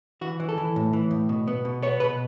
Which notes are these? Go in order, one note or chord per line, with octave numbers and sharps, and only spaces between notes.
E3 F#4
E3
A4
E3
A2
E3
A2
B2
B3
B2
B3 C#5
B2 B4